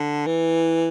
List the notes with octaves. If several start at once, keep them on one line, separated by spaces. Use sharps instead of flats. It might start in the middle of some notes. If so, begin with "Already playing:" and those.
Already playing: D3
E3